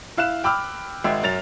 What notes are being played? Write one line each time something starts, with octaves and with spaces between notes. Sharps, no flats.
E4 F5 F#6 E7
G5 B5 D6 E6 F6
G#1 G#3 E5 G5
F#2 A6 F7